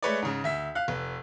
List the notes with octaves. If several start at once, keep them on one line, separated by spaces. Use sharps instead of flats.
G#3 A3 B4 C#5 D5
G#2 C#3
D2 E5 B6
F5 F#6
F1 B4